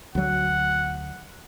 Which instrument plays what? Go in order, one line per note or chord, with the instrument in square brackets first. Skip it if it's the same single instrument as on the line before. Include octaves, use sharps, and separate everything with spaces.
[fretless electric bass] D2 F#3 [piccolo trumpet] F#5